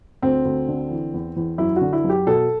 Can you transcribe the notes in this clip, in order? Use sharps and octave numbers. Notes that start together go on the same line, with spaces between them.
D2 C4
D2
D3
E3
E2
E2
F#2 E4
F#4
D3
E4
F#2
G4
B2 A4